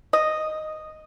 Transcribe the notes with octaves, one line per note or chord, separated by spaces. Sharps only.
D#5